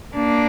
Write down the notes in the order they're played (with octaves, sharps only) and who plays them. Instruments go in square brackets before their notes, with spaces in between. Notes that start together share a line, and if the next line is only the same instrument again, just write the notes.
[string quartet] A#3 D4